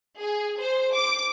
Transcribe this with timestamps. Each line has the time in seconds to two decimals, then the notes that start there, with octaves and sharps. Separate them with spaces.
0.20 G#4
0.60 C5
0.94 D6